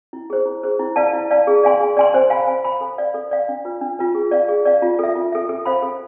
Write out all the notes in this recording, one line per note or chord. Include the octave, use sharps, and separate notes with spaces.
E4
G#4 C5
E4
G#4 C5
E4
B4 D5 F5 A5
E4
B4 D5 F5 A5
G#4
D5 F5 G#5 C6
G#4
D5 F5 G#5 C6
C5
F5 G#5 B5
C5
F5 G#5 B5
A4
D5 F5
A4
D5 F5
D4
F4 B4
D4
F4 B4
G#4
D5 F5
G#4
D5 F5
F4
A4 E5
F4
A4 E5
A4
C5 F5 B5
A4